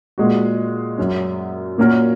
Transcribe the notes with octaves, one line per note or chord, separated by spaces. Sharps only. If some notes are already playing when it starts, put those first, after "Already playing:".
A#2 G#3 F#4
F#2 F#3 C#4
A#2 A#3 C#4 F#4 A#4